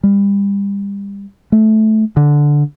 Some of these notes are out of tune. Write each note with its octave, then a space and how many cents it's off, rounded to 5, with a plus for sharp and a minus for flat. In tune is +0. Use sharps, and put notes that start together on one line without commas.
G3 +30
A3 -15
D3 -5